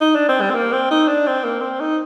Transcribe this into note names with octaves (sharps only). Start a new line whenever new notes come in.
D#4
D4
C4
G3
C4
A#3
C4
D#4
D4
C4
A#3
C4
D#4